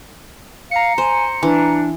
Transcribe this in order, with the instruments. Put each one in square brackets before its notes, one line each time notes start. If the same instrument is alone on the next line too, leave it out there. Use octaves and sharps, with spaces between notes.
[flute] F5 [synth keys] A#5 C#7
[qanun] C5 [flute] G#5
[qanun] E3 [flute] D4